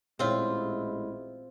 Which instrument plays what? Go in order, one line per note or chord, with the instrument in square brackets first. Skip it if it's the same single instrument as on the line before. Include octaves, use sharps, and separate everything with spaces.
[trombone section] A1 G#3 E4 [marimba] A#2 C#5 [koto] C4 F4